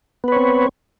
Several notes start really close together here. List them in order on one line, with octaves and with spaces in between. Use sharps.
B3 B4 C#5 C4